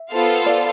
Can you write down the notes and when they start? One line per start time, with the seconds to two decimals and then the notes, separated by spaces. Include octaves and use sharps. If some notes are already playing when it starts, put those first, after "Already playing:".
Already playing: E5
0.10 B3 F4 A4 C5 F5
0.46 D5